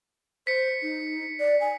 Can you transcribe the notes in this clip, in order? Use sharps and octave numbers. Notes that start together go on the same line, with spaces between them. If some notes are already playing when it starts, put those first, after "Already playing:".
C5 B6 C#7
D#4
D5
G#5